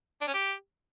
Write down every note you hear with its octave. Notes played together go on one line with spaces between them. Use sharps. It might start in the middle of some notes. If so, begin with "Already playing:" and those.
D4
C#4
G4